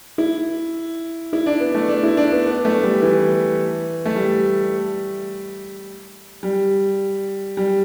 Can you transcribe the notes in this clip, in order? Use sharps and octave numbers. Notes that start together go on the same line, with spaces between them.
E4
E4
D4
B3
A3
D4
E4
D4
B3
B3
A3
G3
E3
A3
G3
G3
G3